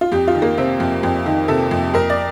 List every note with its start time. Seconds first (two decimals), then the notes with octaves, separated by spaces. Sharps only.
0.01 F4
0.12 F2 G4
0.28 F4
0.35 D#3
0.42 A#3
0.58 C3 C4
0.80 F2
1.03 F2
1.26 D#3
1.48 C3 A4
1.71 F2
1.94 F2 A#4
2.10 D5